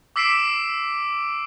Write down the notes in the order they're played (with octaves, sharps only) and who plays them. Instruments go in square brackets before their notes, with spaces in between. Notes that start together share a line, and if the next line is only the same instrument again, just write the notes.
[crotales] D6 E6 B6 C7 D7 E7